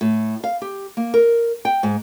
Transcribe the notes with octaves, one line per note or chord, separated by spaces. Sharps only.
A2
F5
G4
A#3
A#4
G5
G#2